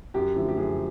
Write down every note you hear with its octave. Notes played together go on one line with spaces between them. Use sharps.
F#2 G4
D3 F3 A3
G4
F#2 G#4